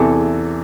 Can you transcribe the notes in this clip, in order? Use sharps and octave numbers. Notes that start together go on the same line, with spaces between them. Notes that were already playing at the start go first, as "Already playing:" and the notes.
Already playing: E2 C3 E3 A4